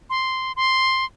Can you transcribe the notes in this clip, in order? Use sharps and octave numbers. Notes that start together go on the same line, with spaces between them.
C6
C6